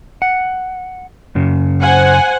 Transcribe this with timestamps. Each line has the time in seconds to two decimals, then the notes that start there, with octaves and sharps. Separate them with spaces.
0.22 F#5
1.35 F#2 C#3
1.80 C5 F#5 G#5